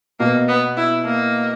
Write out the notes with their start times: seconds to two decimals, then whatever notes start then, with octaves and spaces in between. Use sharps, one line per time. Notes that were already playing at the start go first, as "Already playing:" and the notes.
0.20 B2 A#3
0.49 B3
0.77 E4
1.06 A#3